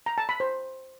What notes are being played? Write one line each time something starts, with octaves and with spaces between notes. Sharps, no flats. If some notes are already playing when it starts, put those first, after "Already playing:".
A#5
A5
B5
C5